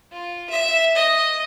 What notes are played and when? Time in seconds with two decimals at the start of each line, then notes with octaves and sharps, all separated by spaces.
0.12 F4
0.50 E5
0.96 D#5